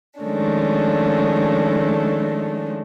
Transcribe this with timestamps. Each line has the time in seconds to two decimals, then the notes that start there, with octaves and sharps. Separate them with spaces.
0.20 D#3 F3 G#3 A3 C#4 D4